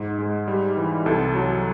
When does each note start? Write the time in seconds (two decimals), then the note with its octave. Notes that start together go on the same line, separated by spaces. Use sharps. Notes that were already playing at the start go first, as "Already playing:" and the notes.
Already playing: G#2
0.19 G#3
0.48 G3
0.77 E3
1.06 C2 A4
1.35 F#3